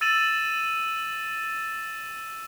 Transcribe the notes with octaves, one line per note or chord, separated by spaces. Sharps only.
E6 A6 D#7 E7 F#7